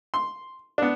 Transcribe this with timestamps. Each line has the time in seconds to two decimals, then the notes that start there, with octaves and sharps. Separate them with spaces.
0.14 C6
0.78 B3 D4